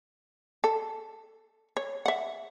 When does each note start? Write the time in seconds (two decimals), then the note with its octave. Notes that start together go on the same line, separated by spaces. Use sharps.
0.64 A4
1.77 C#5
2.06 E5 F#5